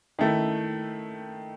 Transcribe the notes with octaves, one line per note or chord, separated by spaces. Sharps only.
D#3 A3 E4